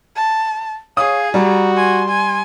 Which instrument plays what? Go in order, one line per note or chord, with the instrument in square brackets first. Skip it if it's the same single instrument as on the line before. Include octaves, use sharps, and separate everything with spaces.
[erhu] A5
[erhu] G#4 [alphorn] C#5 [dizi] F5 [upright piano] D#6
[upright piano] G3 [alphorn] F#4 [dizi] A#5
[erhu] G#5 [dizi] C6
[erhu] G#5